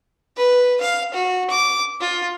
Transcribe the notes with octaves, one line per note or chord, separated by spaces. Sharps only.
B4
F5
F#4
D6
F4